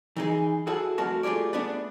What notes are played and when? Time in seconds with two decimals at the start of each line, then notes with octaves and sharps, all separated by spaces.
0.17 E3 D#4 G#4
0.67 E4 F#4 G#4 A4
0.98 F2 A3 F#4 A#4 A5
1.23 A3 F4 G4 G#4 D5
1.53 A3 B3 D4 G#4 B4 D5